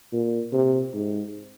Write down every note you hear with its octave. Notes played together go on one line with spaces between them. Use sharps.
A#2
C3
G#2